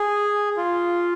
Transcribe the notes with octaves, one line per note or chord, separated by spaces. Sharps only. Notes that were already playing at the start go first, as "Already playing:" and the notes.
Already playing: G#4
F4